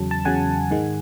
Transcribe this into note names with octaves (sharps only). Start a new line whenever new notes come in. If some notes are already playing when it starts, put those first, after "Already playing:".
Already playing: E2 C#3 F#3 A5
A5
E2 C#3 F#3 F#5 G#5
G#2 D#3 G#3